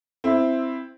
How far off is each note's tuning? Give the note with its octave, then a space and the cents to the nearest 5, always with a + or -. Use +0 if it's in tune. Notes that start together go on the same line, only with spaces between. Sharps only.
C4 +0 E4 +0